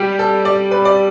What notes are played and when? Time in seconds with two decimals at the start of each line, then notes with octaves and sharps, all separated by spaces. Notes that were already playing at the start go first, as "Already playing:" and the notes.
Already playing: G3 G4
0.19 A4
0.45 D5
0.71 B4
0.85 D5